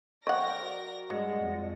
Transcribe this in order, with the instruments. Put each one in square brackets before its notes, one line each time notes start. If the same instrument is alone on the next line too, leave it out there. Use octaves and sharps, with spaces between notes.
[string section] A#4 D5 A#6 [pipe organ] C5 G5 [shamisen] D#5 F#5 [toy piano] C#6
[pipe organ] F#4
[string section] G2 G#3 [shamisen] F#3 [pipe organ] D5 D#5 F#5
[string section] F2